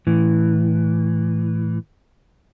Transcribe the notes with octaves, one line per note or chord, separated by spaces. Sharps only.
A2 E3